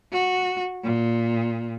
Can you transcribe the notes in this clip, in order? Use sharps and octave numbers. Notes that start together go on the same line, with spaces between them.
F#4
A#2